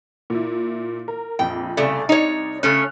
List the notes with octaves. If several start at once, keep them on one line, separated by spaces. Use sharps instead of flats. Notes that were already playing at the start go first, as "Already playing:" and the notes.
A#2 E4
A#4
A#1 F2 G5
C2 C#3 A3 D5
D#4 C#5
C#3 A3 C#4 F6 F#6